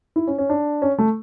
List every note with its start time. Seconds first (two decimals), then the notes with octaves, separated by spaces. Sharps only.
0.16 E4
0.27 C#4
0.38 C#4
0.50 D4
0.82 C#4
0.98 A3